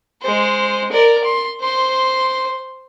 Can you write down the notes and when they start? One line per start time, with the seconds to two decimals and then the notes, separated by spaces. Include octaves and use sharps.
0.22 G#3 C5
0.92 A#4 D5
1.24 C6
1.61 C5 C6